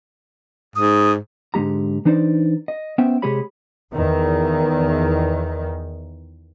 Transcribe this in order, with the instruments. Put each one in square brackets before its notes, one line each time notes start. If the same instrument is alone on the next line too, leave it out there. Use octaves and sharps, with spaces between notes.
[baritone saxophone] G#2 [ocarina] D#6
[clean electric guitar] G#2 D3 G#3 G4 A#5
E3 D4 D#4 C5 D5
D#5
B3 C#4 C5 E5 G5
C3 G#3 G4 G#4 C#5 B5
[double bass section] E2 D#3